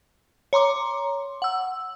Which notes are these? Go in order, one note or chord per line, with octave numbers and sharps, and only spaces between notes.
C#5 A#5 C6 D6
F#5 E6